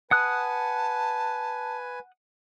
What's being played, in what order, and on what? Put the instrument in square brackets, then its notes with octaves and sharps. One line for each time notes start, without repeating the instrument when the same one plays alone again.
[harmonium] B4 G#5 [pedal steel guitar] F#5 D#6 F#6 [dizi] A5